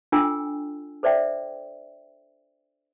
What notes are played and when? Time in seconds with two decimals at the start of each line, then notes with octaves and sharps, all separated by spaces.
0.12 D4 F4 A4 G5 G#5 E6
1.03 A4 C5 D5 E5 G5